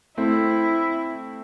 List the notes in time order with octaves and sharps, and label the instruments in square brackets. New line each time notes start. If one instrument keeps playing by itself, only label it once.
[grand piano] A3 C4 [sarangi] E4